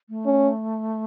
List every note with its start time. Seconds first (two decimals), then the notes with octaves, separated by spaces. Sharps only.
0.09 A3
0.26 C#4